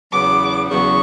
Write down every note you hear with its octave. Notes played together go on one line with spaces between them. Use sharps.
E2 C#3 F#3 B3 D6
E2 C#3 F#3 B3 C#6